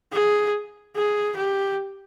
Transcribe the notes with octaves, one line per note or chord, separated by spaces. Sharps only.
G#4
G#4
G4